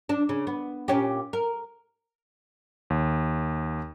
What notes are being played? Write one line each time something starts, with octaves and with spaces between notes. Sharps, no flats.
D4
C#3
B3
A#2 C#4 G4
A#4
D#2